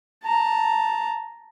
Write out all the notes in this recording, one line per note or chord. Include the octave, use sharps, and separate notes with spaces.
A5 A#5